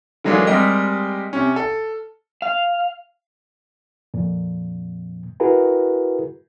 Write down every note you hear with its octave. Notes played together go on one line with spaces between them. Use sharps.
D3 E3 F#3 G#3 A#3 D4
G3 G#3 C4 G4 A#4 D#5
C3 C#4
A4
F5
F2 A#2
E4 F#4 G#4 A#4 B4